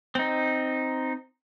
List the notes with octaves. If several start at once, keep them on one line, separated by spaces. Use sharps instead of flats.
C4 D#4